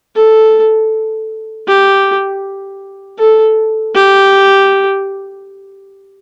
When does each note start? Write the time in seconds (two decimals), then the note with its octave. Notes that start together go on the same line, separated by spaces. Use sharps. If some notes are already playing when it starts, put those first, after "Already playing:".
0.16 A4
1.68 G4
3.18 A4
3.95 G4